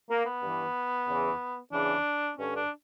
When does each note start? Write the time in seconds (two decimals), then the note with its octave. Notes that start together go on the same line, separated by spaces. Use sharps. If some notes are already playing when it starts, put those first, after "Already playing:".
0.10 A#3
0.25 B3
0.42 G2 E3
1.07 E2 C#3 E3
1.72 E2 C#3 E3 D4
2.37 G2 D3 C#4
2.55 D4